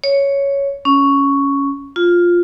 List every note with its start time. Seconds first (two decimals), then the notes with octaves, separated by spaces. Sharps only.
0.04 C#5
0.85 C#4
1.96 F4